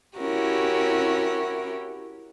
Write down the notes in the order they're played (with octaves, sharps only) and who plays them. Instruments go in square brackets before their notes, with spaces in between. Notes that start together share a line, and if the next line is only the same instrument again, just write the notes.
[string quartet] C#4 E4 F#4 G4 A#4